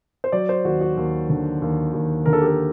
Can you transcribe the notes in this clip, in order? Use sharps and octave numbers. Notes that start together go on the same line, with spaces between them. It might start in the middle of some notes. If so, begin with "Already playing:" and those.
C5
F#3 D5
C5
D#2 F#4
F#4
D#2
D3
D#2
D#2
D3 A#4
A4
G4
A4